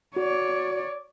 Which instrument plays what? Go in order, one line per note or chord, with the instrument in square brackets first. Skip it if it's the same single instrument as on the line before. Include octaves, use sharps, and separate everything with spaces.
[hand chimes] F#4 [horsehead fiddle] C#5 D5